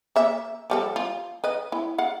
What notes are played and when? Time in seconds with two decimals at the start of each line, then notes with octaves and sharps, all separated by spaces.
0.16 A#3 E5
0.70 F3 G3 A4
0.96 F4
1.44 B4 D#5
1.72 E4
1.98 F5 F#5